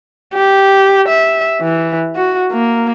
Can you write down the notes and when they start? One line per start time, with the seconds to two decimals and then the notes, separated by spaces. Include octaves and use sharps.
0.34 G4
1.09 E5
1.61 E3
2.16 F#4
2.52 A#3